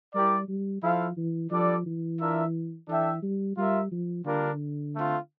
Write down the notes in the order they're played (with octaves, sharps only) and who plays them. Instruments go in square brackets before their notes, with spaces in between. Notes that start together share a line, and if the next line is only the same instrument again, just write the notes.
[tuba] G3 [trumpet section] E4 G4 A#4 D5
[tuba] G3
[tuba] F3 [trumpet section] E4 A4 C5 F5
[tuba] E3
[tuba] F3 [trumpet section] G3 D4 A4 D5
[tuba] E3
[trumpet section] D4 F4 A#4 E5
[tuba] E3 [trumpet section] D4 A4 E5 G5
[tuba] G3
[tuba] G3 [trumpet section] F4 A#4 E5
[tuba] F3
[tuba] D3 [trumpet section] G3 A#3 D4 F4 A#4
[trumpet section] A3 C4 F4